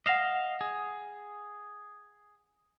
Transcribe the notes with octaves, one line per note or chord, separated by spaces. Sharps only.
D#5 F5 F#5 A#6 E7
G#4